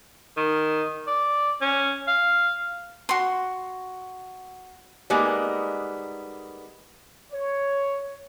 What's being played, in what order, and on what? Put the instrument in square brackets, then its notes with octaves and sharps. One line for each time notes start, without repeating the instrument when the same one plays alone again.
[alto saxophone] D#3
D5
C#4
F5
[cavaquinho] F#4 C6
[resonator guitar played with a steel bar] G3 G#3 A#3 B3 D#4
[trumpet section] C#5